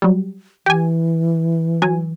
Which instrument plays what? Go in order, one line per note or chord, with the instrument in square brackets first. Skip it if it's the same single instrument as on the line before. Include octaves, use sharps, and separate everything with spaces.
[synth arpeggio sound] F#3 G3
[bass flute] E3 [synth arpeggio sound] G4 G#5
[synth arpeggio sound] F#3 G#5